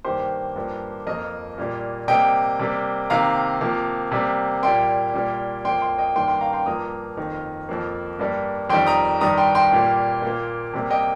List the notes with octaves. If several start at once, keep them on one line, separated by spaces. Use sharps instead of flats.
G2 D#3 A#3 G4 C5
G2 F3 A#3
F2 F3 A#3 A#4 D#5
A#2 G3 A#3
C3 G3 A#3 D#5 G5
C3 G3 A#3
C3 D#3 A#3 F5 A#5
C3 F3 A#3
C3 G3 A#3
A#2 G3 A#3 G5 C6
A#2 G3 A#3
F2 F3 A#3 G5 C6
G5 C6
D#5 G5
G2 D#3 A#3 G5 C6
G5 C6
F5 A#5
G5 C6
G2 F3 A#3 A#5 D#6
F2 D#3 A#3
F2 F3 A#3
G2 G3 A#3
F2 D#3 G3 G5 C6
A#5 D#6
G2 D#3 G3 A#5 D#6
G5 C6
G5 C6
A#2 G3 A#3
A#2 A#3
C3 G3 A#3
D#5 G5